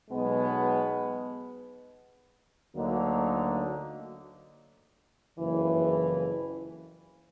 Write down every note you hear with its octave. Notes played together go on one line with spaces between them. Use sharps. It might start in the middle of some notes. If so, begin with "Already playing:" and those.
B1 B2 G#3 B3
D2 D3 F#3 A#3 D#4
F#1 F2 C#3 E3